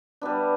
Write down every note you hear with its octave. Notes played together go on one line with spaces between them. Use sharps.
G3 B3 D4